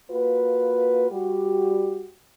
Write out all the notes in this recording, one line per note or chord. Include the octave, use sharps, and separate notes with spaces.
A#3 F4 F#4 B4
G3 F#4 G4